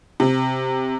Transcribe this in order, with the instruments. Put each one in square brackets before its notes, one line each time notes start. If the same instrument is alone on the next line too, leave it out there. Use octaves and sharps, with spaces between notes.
[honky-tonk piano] C3